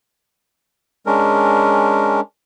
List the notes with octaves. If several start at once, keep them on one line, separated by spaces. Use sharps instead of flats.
G#3 C#4 D4 A#4